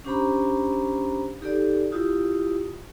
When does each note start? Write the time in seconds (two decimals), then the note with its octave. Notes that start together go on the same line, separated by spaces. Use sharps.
0.05 C#4 D4 G4 C5 A#5 B5
1.41 D#4 G4 A4 D5
1.92 E4 F4 G4 D#6